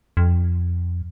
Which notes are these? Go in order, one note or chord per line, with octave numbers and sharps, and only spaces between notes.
F2